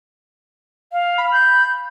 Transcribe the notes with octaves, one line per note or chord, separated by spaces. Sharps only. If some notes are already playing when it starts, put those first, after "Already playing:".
F5
B5
G6